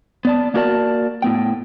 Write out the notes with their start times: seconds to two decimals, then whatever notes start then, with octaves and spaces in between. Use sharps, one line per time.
0.25 B3 D5 A5
0.54 A#3 D4 F#4 A#4 D5 A5
1.22 A2 B3 G5